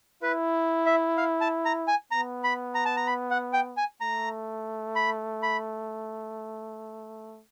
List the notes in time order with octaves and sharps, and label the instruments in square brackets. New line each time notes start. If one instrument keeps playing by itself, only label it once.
[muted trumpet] E4 [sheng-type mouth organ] B4
[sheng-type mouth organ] E5
F5
A5
A#5
G#5
[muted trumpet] B3 [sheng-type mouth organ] A#5
[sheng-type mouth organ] B5
A#5
A5
A#5
B5
F#5
G5
G#5
[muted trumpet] A3 [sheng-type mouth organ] A#5
[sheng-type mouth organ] B5
B5